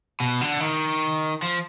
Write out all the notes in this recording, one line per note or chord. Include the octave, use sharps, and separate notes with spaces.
B2
D3
D#3
F3